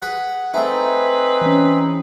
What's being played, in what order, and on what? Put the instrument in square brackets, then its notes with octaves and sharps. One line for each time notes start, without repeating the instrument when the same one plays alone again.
[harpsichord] G#4 B4 [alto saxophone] F#5
[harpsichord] A3 E4 [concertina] C4 D#4 G#4 [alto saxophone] B4
[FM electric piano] E3 C#4